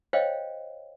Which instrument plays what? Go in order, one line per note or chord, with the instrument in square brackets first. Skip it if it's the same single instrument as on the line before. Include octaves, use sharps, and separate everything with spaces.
[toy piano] C5 C#5 D#5 F5 G5